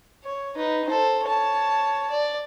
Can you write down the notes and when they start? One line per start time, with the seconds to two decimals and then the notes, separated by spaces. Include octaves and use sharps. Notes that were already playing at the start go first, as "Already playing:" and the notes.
0.24 C#5
0.56 D#4 B4
0.88 A4 C5
1.23 C#5 A5
2.11 D5